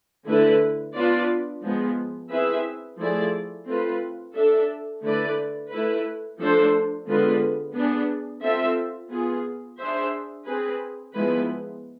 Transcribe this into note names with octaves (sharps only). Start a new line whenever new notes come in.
D3 A3 E4 B4
B3 D4 F4 B4 D5
F3 G#3 B3
C4 E4 G#4 B4 E5
F3 A3 E4 G#4 D5
A3 C4 F4 B4
D4 A4 E5
D3 A3 E4 B4 D5
A3 E4 B4
F3 A3 D4 A4 C5
D3 G#3 B3 F4 B4
B3 D4 G#4
C4 F4 A4 E5
B3 F4 G#4
D4 G#4 C5 E5
C4 G#4 B4
F3 G#3 B3 E4 B4